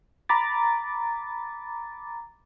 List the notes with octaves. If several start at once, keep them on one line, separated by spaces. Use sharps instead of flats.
A#5 B5 D6 A6